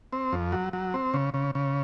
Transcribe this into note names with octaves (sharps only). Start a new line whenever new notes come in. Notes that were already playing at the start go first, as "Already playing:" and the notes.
C4
F2
F#3
F#3
C4
C#3
C#3
C#3